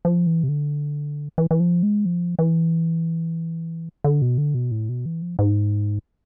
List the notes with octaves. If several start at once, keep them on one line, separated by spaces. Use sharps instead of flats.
F3
E3
C3
D3
E3
E3
F3
G#3
F3
E3
D3
B2
D3
B2
A2
B2
E3
F3
G#2